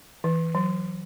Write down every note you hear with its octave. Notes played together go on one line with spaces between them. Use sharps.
E3
F#3